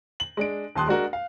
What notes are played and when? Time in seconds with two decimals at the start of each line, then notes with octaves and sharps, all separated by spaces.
0.20 F#7
0.37 G#3 D4 D7
0.75 D#1 D#2 A5 C6 D#6 F#6
0.88 G#3 D4 F#4 A#4
1.13 F5